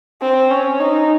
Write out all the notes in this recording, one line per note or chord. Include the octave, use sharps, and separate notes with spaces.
C4
C#4
D#4